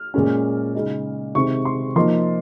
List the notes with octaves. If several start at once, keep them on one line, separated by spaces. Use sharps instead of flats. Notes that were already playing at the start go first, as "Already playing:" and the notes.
Already playing: F6
A#2 G#3 C#4
C#3 G#3 D#4
C3 D#3 G#3 C4 C#6
C6
F3 A#3 D#4 C6